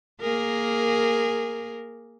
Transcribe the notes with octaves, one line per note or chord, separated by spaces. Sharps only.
A#3 G#4 A#4